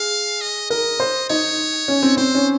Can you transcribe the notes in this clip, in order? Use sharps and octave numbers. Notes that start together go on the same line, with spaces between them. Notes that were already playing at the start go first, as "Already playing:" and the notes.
Already playing: G#4 F5
D#5
A#4 D#5
C5
D#4 C#5
C#4
C4
C4 C5
C#4